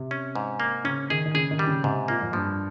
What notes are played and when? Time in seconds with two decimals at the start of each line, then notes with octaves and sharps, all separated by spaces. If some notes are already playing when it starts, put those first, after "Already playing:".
Already playing: C3
0.11 C#4
0.35 G#2
0.60 A#3
0.84 C#3 C#4
1.10 D#3 G#4
1.26 D#3
1.34 C#3 G#4
1.51 D#3
1.59 G3
1.67 C#3
1.84 G#2 C3
2.08 A#2 A#3
2.22 F2
2.33 G2 F3